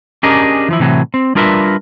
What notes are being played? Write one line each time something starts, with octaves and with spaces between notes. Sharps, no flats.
C#4 D4 G4 G#4 A#4 D#5
E3 F3 E4
A2 C3 E3 F#3
C4
G3 D4 F4 A#4 B4 E5